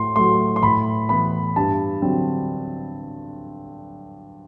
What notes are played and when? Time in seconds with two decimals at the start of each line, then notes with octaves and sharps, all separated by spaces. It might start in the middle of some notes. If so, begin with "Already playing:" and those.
Already playing: A2 C6
0.16 F#3 A3 C6
0.56 C6
0.63 A2 B5
1.09 E3 B3 B5
1.56 G2 A5
2.02 D3 F#3 C4